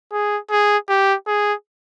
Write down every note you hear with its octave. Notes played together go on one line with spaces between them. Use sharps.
G#4
G#4
G4
G#4